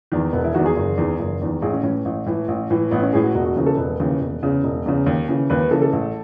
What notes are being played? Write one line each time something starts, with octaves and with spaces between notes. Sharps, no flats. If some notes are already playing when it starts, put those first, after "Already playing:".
E2 D#3
E1 B3
E4
E2 D#3 F#4
G#4
F#1
E2 D#3
F#1
E2 D#3
A1 G#4
C#4
A2 E3 C#4
A1
A2 E3
A1
A2 E3
A1 B3
C#4
A2 E3 G#4
F#4
E1 F#4
F#4
D#2 C#3 E3
A4
E1 B4
D#2 C#3 E3
E1
E2 C#3
E1
E2 C#3
D#2
C#3 E3
D#2 B4
B4
C#3 E3 A4
A4
A1